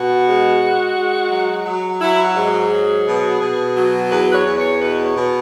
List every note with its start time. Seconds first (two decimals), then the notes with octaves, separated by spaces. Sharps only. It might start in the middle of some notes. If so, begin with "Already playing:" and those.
Already playing: B2 F#4
0.25 G#3
0.60 G#3
0.95 G#3
1.30 F#3
1.66 F#3
2.01 F#3 E4
2.24 F#4
2.35 G#2
2.48 G#4
2.71 F#3
3.05 B2
3.41 B2
3.76 F#3
4.12 E2 B4
4.30 B4
4.35 C#5
4.46 E2
4.58 C#5
4.81 B2 B4
5.05 C#5
5.17 B2